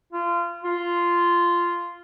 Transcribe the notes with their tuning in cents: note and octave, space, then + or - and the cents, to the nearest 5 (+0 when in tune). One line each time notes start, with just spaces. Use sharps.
F4 -25
F4 -10